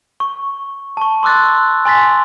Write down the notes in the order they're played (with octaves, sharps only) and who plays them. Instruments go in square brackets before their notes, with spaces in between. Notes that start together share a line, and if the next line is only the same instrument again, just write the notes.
[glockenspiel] C#6
A5 C#6
C6 D6 E6 F#6 A6
G#5 C6 A6 B6